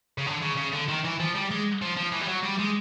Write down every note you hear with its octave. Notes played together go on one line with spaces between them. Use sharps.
C#3
D3
C#3
C#3
D3
D#3
E3
F3
G3
G#3
F3
F3
E3
G3
F#3
G3
G#3